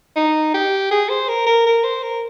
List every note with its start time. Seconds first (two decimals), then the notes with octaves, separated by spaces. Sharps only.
0.16 D#4
0.54 G4
0.91 G#4
1.09 C5
1.28 A#4
1.46 A#4
1.66 A#4
1.84 C5
2.03 A#4